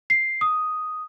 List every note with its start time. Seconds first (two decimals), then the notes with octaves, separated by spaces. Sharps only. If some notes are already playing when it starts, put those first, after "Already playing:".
0.10 C7
0.41 D#6